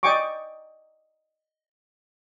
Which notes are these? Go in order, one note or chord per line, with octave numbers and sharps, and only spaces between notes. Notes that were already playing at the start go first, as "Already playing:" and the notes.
D5 D#5 G5 G#5 C#6 D6